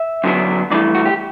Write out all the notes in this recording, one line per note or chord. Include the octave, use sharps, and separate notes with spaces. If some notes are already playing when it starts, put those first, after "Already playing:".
Already playing: E5
F#2 D3 F#3 B3 D4
G2 E3 A3 D5
F#4
G4